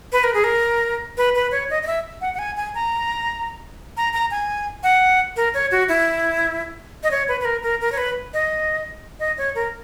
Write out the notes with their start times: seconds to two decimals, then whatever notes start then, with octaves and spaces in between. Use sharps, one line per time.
0.12 B4
0.24 A#4
0.34 G#4
0.44 A#4
1.17 B4
1.35 B4
1.52 C#5
1.70 D#5
1.83 D#5
1.87 E5
2.21 F#5
2.34 F#5
2.39 G#5
2.57 G#5
2.75 A#5
3.97 A#5
4.13 A#5
4.31 G#5
4.83 F#5
5.36 A#4
5.54 C#5
5.71 F#4
5.89 E4
7.03 D#5
7.11 C#5
7.28 B4
7.41 B4
7.45 A#4
7.63 A#4
7.81 A#4
7.92 C#5
7.98 B4
8.33 D#5
9.20 D#5
9.38 C#5
9.55 A#4